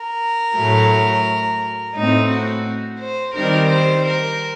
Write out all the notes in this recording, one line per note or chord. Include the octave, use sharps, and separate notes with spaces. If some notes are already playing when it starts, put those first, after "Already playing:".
Already playing: A#4
A2 F#3 A3
A2 A3 C4 D#4
F#4
C5
D#3 G3 C4 A#4
C5
A#4